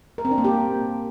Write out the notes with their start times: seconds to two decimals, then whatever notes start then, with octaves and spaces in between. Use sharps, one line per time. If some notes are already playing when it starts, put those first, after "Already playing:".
0.18 A#4
0.25 C4
0.31 D4
0.38 A#3
0.44 G4